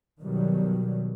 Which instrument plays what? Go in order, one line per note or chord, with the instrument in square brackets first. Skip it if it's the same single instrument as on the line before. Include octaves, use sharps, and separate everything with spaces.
[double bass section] B2 D#3 F#3 G3